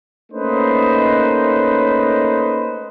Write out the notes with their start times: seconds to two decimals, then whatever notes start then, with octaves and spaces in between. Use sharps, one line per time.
0.32 A3 A#3 C#4 D#4 B4 C5